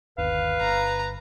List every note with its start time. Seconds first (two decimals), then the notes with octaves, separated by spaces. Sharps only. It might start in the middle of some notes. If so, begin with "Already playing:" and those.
0.18 G1 D#2 B4 F5
0.61 G1 A#5